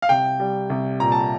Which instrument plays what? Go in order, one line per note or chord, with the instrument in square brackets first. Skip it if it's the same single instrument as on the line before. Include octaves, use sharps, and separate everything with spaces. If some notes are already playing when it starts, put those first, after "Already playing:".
[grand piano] F5
C2 G5
G3
C2
A#2 A#5
A5